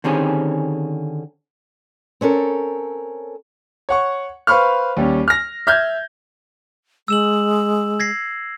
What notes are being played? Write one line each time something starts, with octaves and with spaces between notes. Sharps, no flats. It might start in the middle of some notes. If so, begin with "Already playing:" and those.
D3 D#3 C4 C#4 G4 G#4
C4 C#4 A4 A#4
C#5 F#5 C#6
B4 C5 F5 B5 C#6 F6
D#2 G3 C#4
F6 A#6
E5 F6 G6 G#6
G#3 E6 E7 F#7
G#6 A#6 C7